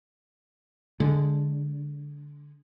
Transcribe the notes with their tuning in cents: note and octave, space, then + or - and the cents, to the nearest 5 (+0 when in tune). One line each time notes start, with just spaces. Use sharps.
D3 -10 G#3 +0